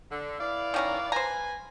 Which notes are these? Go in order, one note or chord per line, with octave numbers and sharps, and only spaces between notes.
D3
E4 B4 D5 F5
D#3 C#4 A#4
B4 C5 G#5 A#5